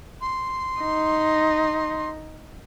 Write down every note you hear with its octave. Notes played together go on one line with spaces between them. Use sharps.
C6
D#4